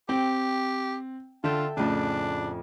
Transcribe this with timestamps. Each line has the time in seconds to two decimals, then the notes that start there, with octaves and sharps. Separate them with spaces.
0.09 C4 G4 G5
1.44 D3 F4 A4 E5 G5
1.77 F2 A2 C#3 D4 G#5